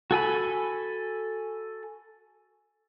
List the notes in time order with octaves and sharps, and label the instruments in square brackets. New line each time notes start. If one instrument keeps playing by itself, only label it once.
[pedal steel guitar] F#4 A4 G#5 B5